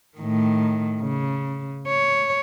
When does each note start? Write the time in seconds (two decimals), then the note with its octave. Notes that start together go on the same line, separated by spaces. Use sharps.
0.18 A2 D#3
1.01 C#3
1.88 C#5